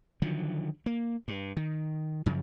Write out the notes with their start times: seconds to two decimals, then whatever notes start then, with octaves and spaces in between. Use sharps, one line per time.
0.22 D3 D#3 F3 F#3
0.86 A#3
1.28 G2
1.57 D#3
2.26 F#2 C#3 F3